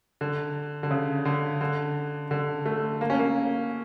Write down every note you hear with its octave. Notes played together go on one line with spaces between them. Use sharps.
D3
D3
C#3
D3
D3
D3
A3
A#3
C#4
A#3